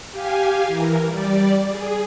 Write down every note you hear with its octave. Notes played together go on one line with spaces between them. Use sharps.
G4 F5 G#5
E3 A#4
G3 D5
G#4